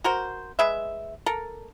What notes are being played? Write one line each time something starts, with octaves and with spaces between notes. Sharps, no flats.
F#4 A#4 C5
G#3 B4 E5
A4 A#4